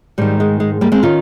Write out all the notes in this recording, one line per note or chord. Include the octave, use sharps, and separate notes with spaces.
G#2 D#3 G3
G#3
G#3
G3 A#3
G#3 C4
D#3 C#4 F4